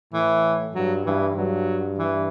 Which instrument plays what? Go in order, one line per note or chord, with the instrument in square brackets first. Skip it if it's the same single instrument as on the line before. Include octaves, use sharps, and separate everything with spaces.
[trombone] A2 [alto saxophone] E3
[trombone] G2 [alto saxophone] F#3
[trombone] G2 [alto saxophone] E3
[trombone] G2 [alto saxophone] F#3
[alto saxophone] E3